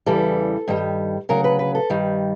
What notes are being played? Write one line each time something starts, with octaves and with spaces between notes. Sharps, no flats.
E2 C#3 E3 G3 A4
G2 D#3 G3
D2 C#3 F#3 A#4
B4
B4
A4
G2 D#3 G3